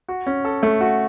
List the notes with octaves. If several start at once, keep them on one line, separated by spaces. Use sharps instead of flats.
F#4
C#4
A4
A3
F#4